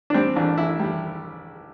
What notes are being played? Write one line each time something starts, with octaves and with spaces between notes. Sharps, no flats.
D4
G3 C4
A1 D4
A1 E4
G3